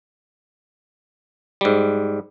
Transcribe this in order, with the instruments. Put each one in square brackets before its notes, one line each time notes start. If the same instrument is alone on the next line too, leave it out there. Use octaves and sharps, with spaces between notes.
[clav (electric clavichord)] G#2 G3